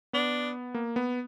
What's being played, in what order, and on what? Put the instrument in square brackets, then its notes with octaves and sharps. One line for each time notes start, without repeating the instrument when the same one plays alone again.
[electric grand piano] B3 [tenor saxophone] D4
[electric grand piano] A#3
B3